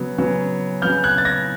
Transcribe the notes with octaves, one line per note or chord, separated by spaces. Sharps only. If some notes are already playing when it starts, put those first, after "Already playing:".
Already playing: C#3 F#3 B3
C#3 F#3 B3
C#3 F#3 B3 F6 G6
F#6 G#6
A6
G#6 A#6